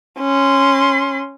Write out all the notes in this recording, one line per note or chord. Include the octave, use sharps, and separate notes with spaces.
C#4 C6